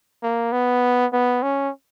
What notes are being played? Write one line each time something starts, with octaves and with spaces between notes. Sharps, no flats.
A#3
B3
B3
C#4